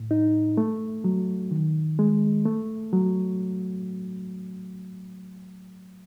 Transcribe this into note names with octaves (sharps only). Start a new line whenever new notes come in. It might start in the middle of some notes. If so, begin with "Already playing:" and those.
Already playing: A2
D#4
A3
F#3
D#3
G#3
A3
F#3